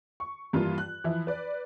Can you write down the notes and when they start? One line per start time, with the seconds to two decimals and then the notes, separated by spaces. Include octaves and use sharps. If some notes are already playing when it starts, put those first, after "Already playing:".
0.20 C#6
0.53 G2 E3 A#3 F4
0.78 F#6
1.04 E3 F3 E4
1.27 B4 D5